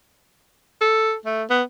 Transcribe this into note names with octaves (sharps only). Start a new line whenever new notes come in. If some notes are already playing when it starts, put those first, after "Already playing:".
A4
A3
B3